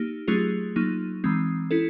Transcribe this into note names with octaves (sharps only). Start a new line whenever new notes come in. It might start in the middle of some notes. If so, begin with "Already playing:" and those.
Already playing: A#3 D#4 G4
F#3 A3 C#4 F4 G#4
F#3 A#3 D#4
E3 G#3 C4
C#4 E4 A4